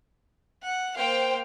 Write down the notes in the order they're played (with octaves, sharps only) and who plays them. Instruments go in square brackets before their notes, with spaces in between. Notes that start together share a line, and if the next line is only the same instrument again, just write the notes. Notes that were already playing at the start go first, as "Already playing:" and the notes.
[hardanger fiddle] F#5
[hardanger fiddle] A#3 F5 [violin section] C5 G5